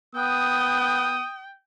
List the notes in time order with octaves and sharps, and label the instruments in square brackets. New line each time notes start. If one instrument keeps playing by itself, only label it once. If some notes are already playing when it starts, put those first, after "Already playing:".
[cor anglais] B3 [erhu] G5 [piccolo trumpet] D#6